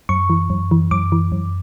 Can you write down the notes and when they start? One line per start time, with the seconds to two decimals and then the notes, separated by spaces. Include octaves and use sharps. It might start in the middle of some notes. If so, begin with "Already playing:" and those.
0.09 F#2 C#6
0.30 E3
0.50 F#2
0.71 E3
0.91 F#2 D6
1.12 E3
1.32 F#2